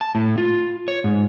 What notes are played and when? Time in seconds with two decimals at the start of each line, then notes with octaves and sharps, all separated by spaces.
0.01 A5
0.15 A2
0.38 F4
0.88 C#5
1.04 G#2